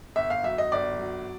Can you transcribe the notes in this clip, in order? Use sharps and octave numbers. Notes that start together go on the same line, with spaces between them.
G1 E5
F5
F#3 E5
D#5
G1 D5
F#3